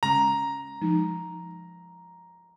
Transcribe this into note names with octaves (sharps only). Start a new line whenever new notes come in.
C#3 G#3 C#4 A#5
F3 G#3 D#4